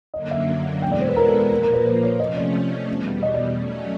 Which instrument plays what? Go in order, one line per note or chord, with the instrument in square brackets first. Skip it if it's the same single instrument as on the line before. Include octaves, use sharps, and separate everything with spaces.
[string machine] F#2 D3 F#3 A#3 [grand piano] D#5
[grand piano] E5
[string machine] E2 B2 G#3 B3 E4 [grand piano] G5
[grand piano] D5
C5
B4
A#4
A4
A4
[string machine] A#2 F3 A#3 [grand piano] A#4
[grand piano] A#4
B4
C5
C#5
[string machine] C3 F3 A3 C#4 [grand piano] D#5
[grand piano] D5
[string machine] E2 B2 G3
[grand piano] D#5
D5
[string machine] F#3 A3 C#4